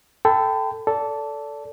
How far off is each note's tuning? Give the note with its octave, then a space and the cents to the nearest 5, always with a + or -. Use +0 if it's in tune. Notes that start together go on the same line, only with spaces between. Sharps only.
A4 +0 G5 +0 B5 +40
A4 +0 D5 -25